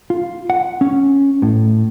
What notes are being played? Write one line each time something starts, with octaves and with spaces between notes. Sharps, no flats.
F4
F#5
C#4
A2